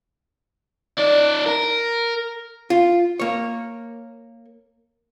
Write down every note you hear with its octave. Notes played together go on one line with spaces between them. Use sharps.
D#4 D5
A#4
F4
A#3 C#5